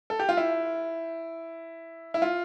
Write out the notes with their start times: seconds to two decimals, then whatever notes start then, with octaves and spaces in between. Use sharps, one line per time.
0.10 A4
0.20 G4
0.29 F4
0.37 E4
2.14 E4
2.22 F4